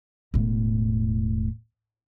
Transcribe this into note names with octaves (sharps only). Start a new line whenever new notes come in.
E1 A2